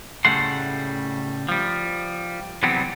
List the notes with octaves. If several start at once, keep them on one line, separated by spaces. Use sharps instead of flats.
A2 C#3 G3 A3 F#5 C6
F3 G3
E2 C3 F#3 G3 B3 C4